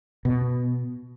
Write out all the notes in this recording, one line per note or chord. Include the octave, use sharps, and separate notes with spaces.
B2